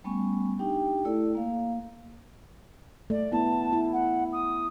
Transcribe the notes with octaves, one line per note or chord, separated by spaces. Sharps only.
G3 A3 B3 C#4 G#5 C#6
D4 D#4 G4 G5
A3 E4 A4 D5
A#3 F5
A3 D5
B3 E4 A5
E4
F#5
D#6